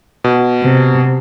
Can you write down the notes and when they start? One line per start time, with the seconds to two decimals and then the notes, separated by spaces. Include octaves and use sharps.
0.24 B2
0.62 C3